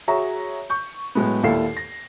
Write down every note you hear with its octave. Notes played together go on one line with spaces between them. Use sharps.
F#4 G#4 C#5 E5 A#5
C#6 G6
A2 F#3 G#3 A3 B3
D#2 A#2 E4 A4 F5 C7
A#6